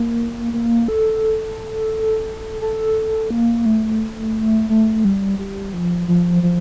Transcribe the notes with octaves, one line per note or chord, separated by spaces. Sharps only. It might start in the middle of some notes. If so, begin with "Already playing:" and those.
Already playing: A#3
A#3
A4
A4
A#3
A3
A3
G3
G3
F3
F3
F3